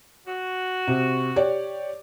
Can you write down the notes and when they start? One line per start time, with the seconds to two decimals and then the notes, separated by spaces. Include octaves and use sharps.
0.28 F#4
0.87 C3
1.36 G4 C#5 D5